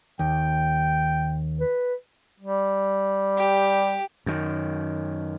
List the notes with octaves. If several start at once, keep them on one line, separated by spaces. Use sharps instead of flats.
D#2 G5
B4
G3
G4
F#2 D#3